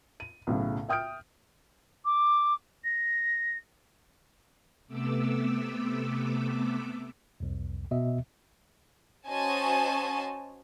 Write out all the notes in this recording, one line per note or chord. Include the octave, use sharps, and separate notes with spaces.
D#7
B1 A2 C#3
E5 G5 D#6 F6 G6 D7
D6
A#6
C3 A3 B3 D6 E6
C2 F2
B2 D#5 E5
C#4 F#4 C5 D#5 G#5 A5